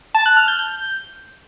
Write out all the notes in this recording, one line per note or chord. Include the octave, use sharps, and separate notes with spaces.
A5
F#6
F6
G6
G6